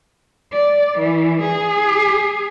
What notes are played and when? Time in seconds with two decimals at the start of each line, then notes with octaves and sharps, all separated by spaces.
0.52 D5
0.98 E3
1.42 G#4